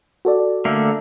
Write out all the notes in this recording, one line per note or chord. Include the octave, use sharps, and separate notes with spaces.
F#4 A4 D5
D3 A3 A#3